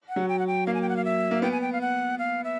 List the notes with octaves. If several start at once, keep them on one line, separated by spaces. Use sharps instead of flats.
F#5
F#3
G5
F#5
G5
A#3 F5
G#5
G5
F#5
F5
E5
A#3
B3 G5
G#5
G5
F5
F#5
F5
E5